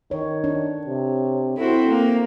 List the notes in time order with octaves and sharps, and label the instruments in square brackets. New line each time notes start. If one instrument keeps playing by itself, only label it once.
[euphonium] D#3 [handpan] C#5
[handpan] D4 [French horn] C#5
[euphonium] C3
[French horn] C4 [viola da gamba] E4 F#4 C5 [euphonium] A4
[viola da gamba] A#3